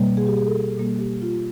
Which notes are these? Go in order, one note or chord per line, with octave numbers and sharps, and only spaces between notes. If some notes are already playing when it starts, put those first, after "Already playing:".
Already playing: B2 G3 A#3
G#4
G4
G#4
A4
B2 G3 A#3 A4
G4
F4